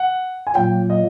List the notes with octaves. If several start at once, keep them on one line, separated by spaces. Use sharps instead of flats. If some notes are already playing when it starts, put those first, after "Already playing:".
Already playing: F#5
G#5
A#2 F#3 A#3 G5
D#5